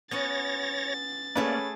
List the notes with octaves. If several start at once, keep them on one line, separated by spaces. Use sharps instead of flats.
B3 C#4 F#4 C#5 A6 A#6
A3 A#3 C#4 G#4 B4 D5 F#5